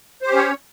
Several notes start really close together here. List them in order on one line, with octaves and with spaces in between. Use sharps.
C5 G4 C#4 C#5